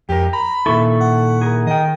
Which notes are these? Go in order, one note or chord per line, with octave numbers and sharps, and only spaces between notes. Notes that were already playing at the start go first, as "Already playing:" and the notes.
F2 G4 A#4
A#5 B5
A#2 D#3 E4 A4 C#6
F#5
G#4 A#4
D#3 D#5 G5